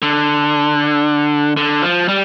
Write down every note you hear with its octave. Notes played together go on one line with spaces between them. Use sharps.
D3
D3
F3
G3